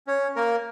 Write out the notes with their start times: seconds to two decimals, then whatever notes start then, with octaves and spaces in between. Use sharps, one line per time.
0.07 C#4 C#5
0.36 A#3 A#4